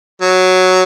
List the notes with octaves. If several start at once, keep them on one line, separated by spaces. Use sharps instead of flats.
F#3